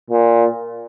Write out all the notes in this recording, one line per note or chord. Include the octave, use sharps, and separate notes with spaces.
A#2